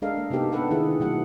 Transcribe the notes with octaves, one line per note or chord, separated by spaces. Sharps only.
G#3 D4 A4 A#4 D#5 F5
A#3
C3 B3 D#4 G4 A4
B3 D4 A4 B4 F#5
D#3 E4 G#4 B4
B2 D#3 F#3 A3 F#5